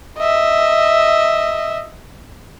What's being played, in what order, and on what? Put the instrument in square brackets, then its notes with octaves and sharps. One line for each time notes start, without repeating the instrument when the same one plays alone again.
[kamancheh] D#5 E5